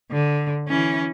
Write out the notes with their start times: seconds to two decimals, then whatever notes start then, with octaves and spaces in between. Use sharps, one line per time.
0.12 D3
0.68 E3 C#4